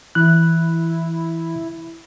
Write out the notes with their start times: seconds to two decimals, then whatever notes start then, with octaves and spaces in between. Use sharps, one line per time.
0.15 E3 E4 F#6